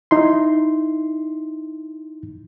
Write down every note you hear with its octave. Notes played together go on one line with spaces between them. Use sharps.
D#4 E4 C6